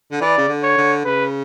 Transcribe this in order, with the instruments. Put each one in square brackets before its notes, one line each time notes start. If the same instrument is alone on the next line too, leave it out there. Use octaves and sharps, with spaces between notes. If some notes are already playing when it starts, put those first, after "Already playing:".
[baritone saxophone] D3
[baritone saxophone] E3 [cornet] D5
[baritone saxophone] C#3
D3
[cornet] C#5
[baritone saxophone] D3
[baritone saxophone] C#3 [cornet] B4